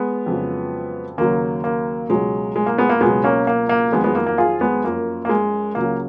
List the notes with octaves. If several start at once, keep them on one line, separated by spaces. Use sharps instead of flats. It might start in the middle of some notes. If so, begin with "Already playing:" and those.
Already playing: G#3 B3
F2 C#3 F#3
D#2 C#3 F#3 A#3
A#3
C#2 B2 F#3 G#3
G#3
A#3
G#3 B3
A#3
C#2 B2 F#3 G#3 B3
A#3 C#4
A#3
A#3
F2 D#3 F#3 G#3 B3
G#3 B3
A#3
A#3
F4 G#4
G#3 B3
F#2 F3 A#3
A#3
G#3
C#2 C#3 F#3 A#3